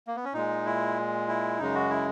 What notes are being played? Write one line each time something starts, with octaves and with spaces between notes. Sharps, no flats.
A#3
B3
C#4
A#2 G#3 D#4
E4
E4
F#2 C#3 G#3 D#4
F#4
E4